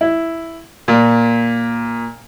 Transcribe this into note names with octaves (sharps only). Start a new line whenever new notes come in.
E4
A#2